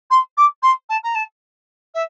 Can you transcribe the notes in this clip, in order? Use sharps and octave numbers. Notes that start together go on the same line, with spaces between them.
C6
D6
C6
A5
A#5
A5
E5